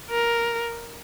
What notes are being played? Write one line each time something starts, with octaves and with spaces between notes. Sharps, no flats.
A#4